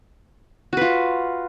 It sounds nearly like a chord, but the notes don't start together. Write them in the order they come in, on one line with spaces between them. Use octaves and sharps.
F#4 B4 F4